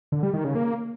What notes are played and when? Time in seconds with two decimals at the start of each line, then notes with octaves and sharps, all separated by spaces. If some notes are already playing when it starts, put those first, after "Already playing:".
0.12 D3
0.23 G3
0.34 D#3
0.44 C#3
0.55 A#3